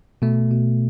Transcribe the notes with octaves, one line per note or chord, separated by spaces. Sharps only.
B2 A3
B2